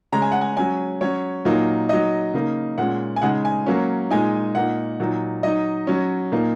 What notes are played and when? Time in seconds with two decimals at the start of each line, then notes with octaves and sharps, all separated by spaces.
0.12 C#3 G#3 C#4 A#5
0.22 G#5
0.32 F#5
0.41 G#5
0.57 F#3 C#4 G#5
1.01 F#3 C#4 C#5
1.45 A#2 F#3 A#3 D#4
1.89 F#3 D#4 D#5
2.34 C#3 A#3 D#4
2.78 A#2 G#3 C#4 F#5
3.16 G#5
3.22 C#3 G#3 D#4 F#5
3.45 G#5
3.66 F#3 A#3 C#4
4.11 A#2 G#3 D#4 G#5
4.55 A#2 A#3 D#4 F#5
5.00 A#2 F#3 D#4
5.43 F#3 D#4 D#5
5.87 F#3 C#4
6.32 A#2 A#3 D#4